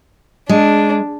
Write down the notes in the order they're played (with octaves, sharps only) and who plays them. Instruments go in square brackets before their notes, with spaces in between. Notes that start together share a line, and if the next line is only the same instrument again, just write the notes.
[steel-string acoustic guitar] G#3 [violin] D4